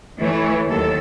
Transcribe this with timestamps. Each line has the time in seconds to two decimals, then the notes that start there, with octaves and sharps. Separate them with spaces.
0.19 E3 A3 C#5
0.67 D#2 F#3 A4